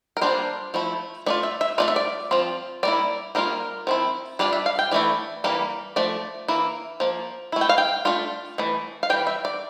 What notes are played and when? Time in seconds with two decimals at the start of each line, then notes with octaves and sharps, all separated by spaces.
0.17 A#4
0.21 G3 A#3 D4 F4 C5
0.74 F3 A3 E4
1.26 A3 D4 F4 D5
1.43 E5
1.61 E5
1.78 A3 D4 F4 D5
1.88 E5
1.96 D5
2.31 F3 C4 F4
2.83 G3 A#3 E4 D5
3.35 G3 A#3 F4 A#4
3.87 F3 C4 E4
4.39 G3 D4 F4 D5
4.53 E5
4.66 F5
4.79 G5
4.91 E3 A3 E4 D5
5.44 E3 G3 A#3
5.96 F3 A3 D5
6.48 E3 A#3 E4
7.00 F3 A#3
7.52 A3 E4
7.61 G5
7.69 F5
7.78 G5
8.05 A3 D4 F4
8.58 E3 A3
9.03 F5
9.10 E3 G3 G5
9.27 E5
9.45 D5